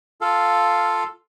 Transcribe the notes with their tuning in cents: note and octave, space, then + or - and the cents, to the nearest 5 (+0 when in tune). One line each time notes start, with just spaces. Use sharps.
F4 +0 A4 +0 F5 +0